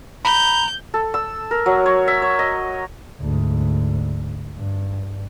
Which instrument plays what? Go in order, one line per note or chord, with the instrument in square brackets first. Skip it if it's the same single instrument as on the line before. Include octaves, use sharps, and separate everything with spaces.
[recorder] A#5 [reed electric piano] B5 [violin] G6
[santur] A4
E6
A#4
F#3
C#5
E5
C#5
D#5
[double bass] D2 G#2
G2